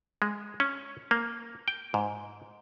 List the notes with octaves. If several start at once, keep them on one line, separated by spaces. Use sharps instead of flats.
G#3
C#4
A#3
G5
G#2